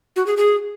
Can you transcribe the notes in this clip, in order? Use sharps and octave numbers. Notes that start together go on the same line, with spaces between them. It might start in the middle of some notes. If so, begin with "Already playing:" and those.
F#4
G#4
G#4